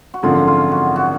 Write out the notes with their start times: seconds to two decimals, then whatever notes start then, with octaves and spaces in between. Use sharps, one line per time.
0.14 F#4
0.23 G#1 F#2 D3 F3 F4
0.47 F4
0.72 F#4
0.96 F#4